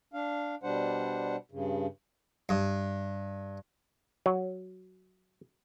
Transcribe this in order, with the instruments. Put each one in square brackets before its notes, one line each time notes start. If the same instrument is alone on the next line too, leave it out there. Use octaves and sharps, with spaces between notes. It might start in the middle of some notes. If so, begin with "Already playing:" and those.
[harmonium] D4 F5
B2 G3 D4 C5 F#5
G2 C#3
[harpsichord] G2
[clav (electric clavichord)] F#3